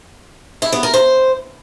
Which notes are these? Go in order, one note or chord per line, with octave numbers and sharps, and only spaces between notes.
E4
B3
A#4
C5